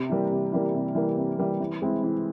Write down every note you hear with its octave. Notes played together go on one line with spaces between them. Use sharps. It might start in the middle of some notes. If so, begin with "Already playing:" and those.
Already playing: C3
E3 G3 A#3
C3
E3 G3 A#3
C3
E3 G3 A#3
C3
E3 G3 A#3
E3
G#3 C4 E4
E3